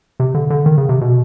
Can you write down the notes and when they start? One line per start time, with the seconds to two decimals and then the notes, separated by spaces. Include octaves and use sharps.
0.20 C3
0.34 D3
0.50 D3
0.66 D#3
0.78 C#3
0.89 C3
1.01 B2